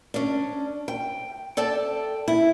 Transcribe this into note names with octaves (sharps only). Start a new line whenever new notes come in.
C#4 D4
G5
A4 D5 G5 A5
E4